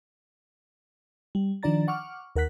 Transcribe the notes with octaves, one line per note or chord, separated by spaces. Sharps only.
G3
D#3 F3 D4 D5 A#5 A6
F#5 C#6 D6 F6
D#2 A#4 F#5 F#6 B6